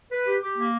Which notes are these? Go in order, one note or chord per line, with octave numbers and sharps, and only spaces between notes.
B4
G4
G4
A#3